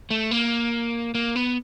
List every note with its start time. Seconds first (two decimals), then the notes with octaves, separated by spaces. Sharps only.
0.11 A3
0.31 A#3
1.15 A#3
1.36 B3